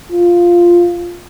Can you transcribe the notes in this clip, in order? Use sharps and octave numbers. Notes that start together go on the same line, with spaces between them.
F4